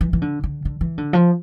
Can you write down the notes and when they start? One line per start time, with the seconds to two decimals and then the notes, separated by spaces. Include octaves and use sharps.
0.01 E3
0.13 E3
0.22 D3
0.44 D3
0.65 D3
0.81 E3
0.98 D3
1.13 F3